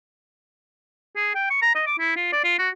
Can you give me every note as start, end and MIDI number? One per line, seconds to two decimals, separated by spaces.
1.16 1.33 68
1.35 1.49 79
1.50 1.59 85
1.62 1.73 82
1.75 1.85 75
1.87 1.98 86
1.99 2.13 64
2.16 2.32 65
2.32 2.42 74
2.44 2.58 65
2.58 2.69 66